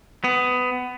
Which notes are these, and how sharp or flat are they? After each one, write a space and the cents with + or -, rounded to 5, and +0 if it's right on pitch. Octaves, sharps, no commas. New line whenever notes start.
B3 +20